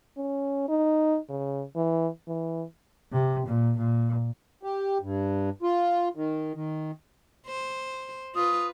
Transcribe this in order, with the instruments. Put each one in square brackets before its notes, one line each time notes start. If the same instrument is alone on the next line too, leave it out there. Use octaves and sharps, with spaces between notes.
[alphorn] C#4
D#4
C#3
E3
E3
[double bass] C3
A#2
A#2
[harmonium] G4
G2
F4
D#3
D#3
[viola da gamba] C5
[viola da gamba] F4 B4 [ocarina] D#6